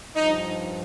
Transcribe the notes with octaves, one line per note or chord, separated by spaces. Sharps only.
G2 F3 D#4